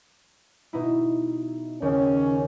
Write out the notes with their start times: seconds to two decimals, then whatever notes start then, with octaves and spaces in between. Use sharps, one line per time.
0.73 B2 D#4 E4
1.82 D#2 C#3 C#4